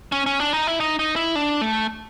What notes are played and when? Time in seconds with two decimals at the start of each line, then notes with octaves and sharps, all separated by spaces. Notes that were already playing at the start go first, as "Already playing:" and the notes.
0.12 C#4
0.26 C#4
0.40 D4
0.53 D#4
0.67 E4
0.80 D#4
0.99 D#4
1.16 E4
1.35 D4
1.61 A3